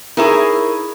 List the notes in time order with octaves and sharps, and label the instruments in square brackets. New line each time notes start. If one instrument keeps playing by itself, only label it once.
[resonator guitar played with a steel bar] D#4 E4 G#4 [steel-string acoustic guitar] A#4 C#5